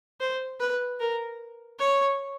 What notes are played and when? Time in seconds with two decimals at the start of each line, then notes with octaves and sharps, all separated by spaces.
0.20 C5
0.60 B4
1.00 A#4
1.79 C#5